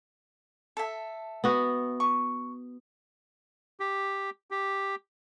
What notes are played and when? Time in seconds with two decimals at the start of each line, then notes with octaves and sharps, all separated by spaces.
0.77 A4 E5
1.44 B3 F#4
2.00 C#6
3.80 G4
4.51 G4